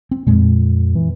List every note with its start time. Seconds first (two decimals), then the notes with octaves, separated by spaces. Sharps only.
0.11 C4
0.27 F2 A#2 G#3
0.95 E3